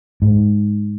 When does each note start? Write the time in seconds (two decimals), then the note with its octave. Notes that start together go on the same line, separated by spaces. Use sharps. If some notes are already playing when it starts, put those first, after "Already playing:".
0.22 G#2